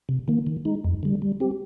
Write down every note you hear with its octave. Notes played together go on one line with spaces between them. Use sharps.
C3
D#3 A#3
D#3
G#3 D#4
F2
D3 G3
G3
C4 G4